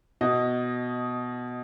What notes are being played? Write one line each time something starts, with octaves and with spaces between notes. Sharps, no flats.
B2 D#5